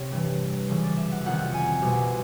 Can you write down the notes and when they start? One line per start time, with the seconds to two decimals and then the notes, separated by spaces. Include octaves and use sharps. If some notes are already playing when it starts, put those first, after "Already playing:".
Already playing: C3 C#5
0.12 G2 E3
0.69 F#2 C#3 E3
0.83 D5
0.97 E5
1.11 F#5
1.26 F2 C3 D#3 F#5
1.54 G#5
1.82 C2 B2